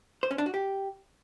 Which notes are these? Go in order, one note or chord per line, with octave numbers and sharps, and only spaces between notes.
C5
C#4
D4
F#4
G4